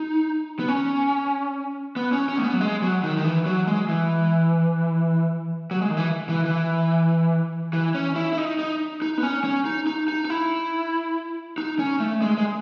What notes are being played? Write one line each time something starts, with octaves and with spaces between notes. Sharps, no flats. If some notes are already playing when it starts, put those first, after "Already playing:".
Already playing: D#4
B3
C#4
B3
C#4
C#4
A3
B3
F#3
G#3
F#3
D#3
D#3
E3
F#3
G#3
E3
F#3
G#3
D#3
E3
E3
E3
E3
C#4
E4
E4
D#4
D#4
D#4
B3
C#4
C#4
D#4
D#4
D#4
D#4
E4
D#4
C#4
A3
G#3
G#3